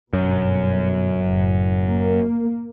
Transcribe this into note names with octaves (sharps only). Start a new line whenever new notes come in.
G1 F#2 B2
F#1 A2
A#3